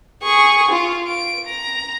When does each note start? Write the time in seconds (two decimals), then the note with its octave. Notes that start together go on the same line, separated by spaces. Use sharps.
0.23 G#4 C#6
0.71 F4
1.08 D7
1.47 A#5